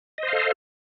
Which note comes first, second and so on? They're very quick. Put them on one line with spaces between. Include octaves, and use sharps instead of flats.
D#5 C5 F5 A4